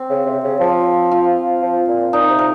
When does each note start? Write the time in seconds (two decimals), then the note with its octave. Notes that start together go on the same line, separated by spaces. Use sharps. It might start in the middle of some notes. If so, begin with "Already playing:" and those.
Already playing: C4
0.10 C#3
0.26 C3
0.43 C#3
0.60 F3
1.11 F4
1.62 F3
1.88 A#2
2.13 A#2 D#4
2.30 C3
2.39 A#4